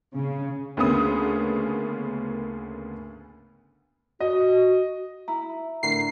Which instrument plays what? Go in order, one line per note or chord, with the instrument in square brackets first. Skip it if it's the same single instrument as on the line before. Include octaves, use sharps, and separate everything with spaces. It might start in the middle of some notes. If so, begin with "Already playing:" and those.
[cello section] C#3
[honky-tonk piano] D2 C#3 A#3 B3 C#4 D#6
[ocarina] F#4 [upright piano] D#5
[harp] E4 [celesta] A#5
[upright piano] A2 D3 A#4 [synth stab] C7